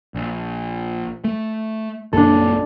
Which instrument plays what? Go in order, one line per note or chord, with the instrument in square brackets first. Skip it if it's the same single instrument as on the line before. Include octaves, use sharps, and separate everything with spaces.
[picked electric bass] A#1
A3
[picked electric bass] A#1 F#2 A#3 [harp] D4 A4